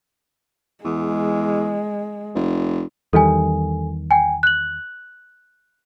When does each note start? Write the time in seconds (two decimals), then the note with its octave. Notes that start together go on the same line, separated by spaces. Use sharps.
0.85 E2 G#3
2.35 F1
3.13 E2 D#3 G3 A4 G#5
4.11 G5 G#5
4.43 F#6 F#7